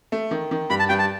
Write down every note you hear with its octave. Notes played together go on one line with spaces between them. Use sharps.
A3
D#3
D#3
G2 B5
A5
G2 G5
A5